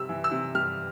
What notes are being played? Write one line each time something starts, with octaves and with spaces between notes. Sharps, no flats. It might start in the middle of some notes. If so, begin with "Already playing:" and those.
Already playing: C3 G3 E6
E3
E6
C3
G3 F6